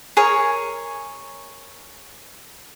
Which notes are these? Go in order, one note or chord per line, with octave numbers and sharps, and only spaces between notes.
G#4 A#4 C#5